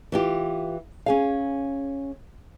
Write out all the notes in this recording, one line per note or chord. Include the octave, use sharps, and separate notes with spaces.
E3 F4 G4
C#4 G#4 F5